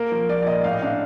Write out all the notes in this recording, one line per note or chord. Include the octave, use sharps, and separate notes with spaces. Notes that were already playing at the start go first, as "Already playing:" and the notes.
Already playing: A#3 A#4
F3
F3 D5
D5
A#2 D#5
A2 F5
D#5
D4 F5